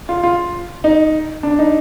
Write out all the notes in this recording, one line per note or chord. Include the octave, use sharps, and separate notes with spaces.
F4
F4
D#4
D4
D#4